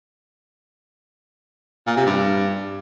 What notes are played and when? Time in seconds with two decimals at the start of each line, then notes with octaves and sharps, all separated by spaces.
1.87 A#2
1.96 C3
2.06 G2